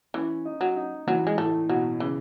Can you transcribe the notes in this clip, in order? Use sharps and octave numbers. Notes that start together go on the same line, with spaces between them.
E3 C#4
D#4
F#3
D#4
E3 F#3
G#3
A2 A3
B2 F#3
C#3 E3